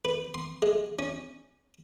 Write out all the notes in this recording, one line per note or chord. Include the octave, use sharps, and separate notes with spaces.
B4
C6
G#3
C#4